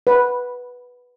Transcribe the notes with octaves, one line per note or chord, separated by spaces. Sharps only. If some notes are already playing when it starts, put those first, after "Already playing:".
B4